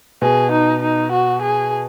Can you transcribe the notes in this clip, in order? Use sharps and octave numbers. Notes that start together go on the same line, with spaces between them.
B2 G#4
D#4
D#4
F#4
G#4